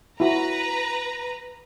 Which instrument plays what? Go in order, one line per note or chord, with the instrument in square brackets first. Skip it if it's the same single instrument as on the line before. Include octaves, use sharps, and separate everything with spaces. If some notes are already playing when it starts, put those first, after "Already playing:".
[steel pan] E4 F#4 [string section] B4 A#5